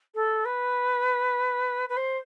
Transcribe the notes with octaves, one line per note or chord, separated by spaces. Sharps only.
A4
B4
B4
C5